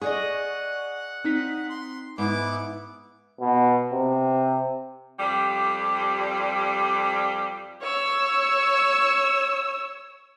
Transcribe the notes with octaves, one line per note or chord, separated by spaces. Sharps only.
G#4 D5 D#5 F#5 C#6
C4 D#4 B6
C6
G#2 B3 E4 G#5 D6
B2
C3
F2 G3 G4
C#5 E6